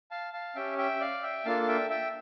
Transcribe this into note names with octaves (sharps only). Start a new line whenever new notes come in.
F5 A5
F5 A5
C#4 G4 E5 G5
E5 G5
D5 F5
E5 G5
A#3 D4 F4 A4 F5 A5
F5
E5 G5
E5 G5